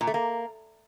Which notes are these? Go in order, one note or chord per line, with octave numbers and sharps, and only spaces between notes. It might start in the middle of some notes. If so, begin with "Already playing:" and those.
A#2
A3
A#3